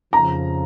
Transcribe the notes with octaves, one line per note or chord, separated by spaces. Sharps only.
F2 C#3 F3 A#5